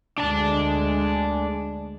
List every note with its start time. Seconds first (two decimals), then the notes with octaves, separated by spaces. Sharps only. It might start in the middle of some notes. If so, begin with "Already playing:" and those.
0.18 D2 G#3 D4 A5